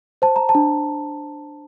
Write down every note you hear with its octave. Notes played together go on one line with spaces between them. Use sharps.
C5 A5
A#5
A5
D4